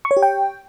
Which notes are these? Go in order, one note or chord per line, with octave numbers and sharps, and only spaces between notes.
C#6
C#5
G4
G5